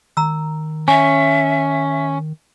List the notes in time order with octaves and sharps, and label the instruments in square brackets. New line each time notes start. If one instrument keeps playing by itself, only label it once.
[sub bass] D#3 [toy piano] A#5 E6
[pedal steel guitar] C#4 [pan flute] E5 [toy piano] G#5